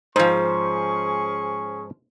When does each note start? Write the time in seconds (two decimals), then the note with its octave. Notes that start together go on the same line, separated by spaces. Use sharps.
0.16 G#2 F3 C#4 G#4 C5 C#6